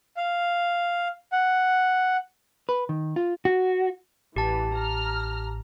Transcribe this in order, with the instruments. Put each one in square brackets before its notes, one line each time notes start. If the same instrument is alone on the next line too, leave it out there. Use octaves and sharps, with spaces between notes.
[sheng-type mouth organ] F5
F#5
[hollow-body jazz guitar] B4
D#3
F4
[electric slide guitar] F#4
[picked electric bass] A1 [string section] E3 [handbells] G4 A5
[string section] A#5 F6